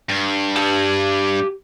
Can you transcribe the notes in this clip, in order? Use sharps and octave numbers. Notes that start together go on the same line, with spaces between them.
G2
G4 A5